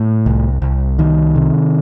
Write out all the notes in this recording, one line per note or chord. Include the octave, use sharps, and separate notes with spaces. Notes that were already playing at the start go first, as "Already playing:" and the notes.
Already playing: A2
C2
C2
D#3
C3